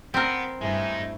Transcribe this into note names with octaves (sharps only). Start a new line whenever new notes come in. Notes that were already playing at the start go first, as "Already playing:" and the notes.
B3 C4 A#4
G2 G#3 A3 D#4 E4